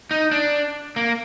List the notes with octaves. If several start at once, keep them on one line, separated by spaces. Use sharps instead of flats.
D#4
D4
A#3